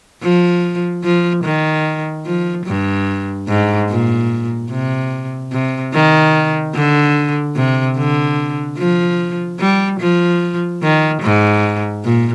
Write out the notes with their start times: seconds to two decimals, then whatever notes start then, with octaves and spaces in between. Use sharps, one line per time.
0.22 F3
1.04 F3
1.44 D#3
2.26 F3
2.66 G2
3.48 G#2
3.89 A#2
4.70 C3
5.52 C3
5.93 D#3
6.75 D3
7.56 C3
7.97 D3
8.78 F3
9.60 G3
10.00 F3
10.82 D#3
11.22 G#2
12.04 A#2